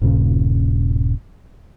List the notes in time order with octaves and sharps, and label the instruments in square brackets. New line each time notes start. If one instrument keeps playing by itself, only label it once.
[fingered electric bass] D#1 G2 A#2 C#3